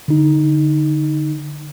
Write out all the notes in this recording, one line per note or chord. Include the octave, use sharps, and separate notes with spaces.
D3 D#4